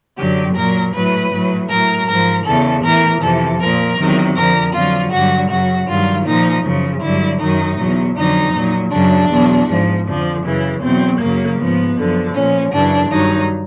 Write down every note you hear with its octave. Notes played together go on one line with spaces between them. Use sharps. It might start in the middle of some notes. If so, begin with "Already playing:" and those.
F#2 D3 F#3 G4
A#2 F#3 A#4
A2 F#3 B4
A2 F#3
A2 F#3 A#4
G#2 F3 A#4
E2 C#3 E3 A4
A2 E3 A#4
F2 C3 E3 A4
A#2 F3 A#4
E2 C3 D#3 F#3
F2 D3 F3 A#4
F2 D3 F#3 F4
G2 D3 F#3 F#4
F#2 C#3 F#3 F#4
G2 D#3 F#3 F4
A#2 F3 D#4
F#2 C#3 F3
G2 D3 F#3 E4
F#2 D#3 F#3 D#4
E2 B2 F#3
F2 D3 F#3 D#4
A#2 F#3
F#2 C#3 F#3 D4
E2 B2 F#3
G#2 F3
F2 D3 F3
F#2 C#3 E3
E2 B2 F#3 C4
F#2 C#3 F#3 A#3
G#2 F3 B3
F#2 D3 F3
A#2 F3 C#4
F#2 C#3 E3 D4
G2 D#3 F#3 D#4